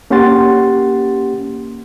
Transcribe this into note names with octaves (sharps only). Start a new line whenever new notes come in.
A#3 C#4 G4 F#5 C6 A6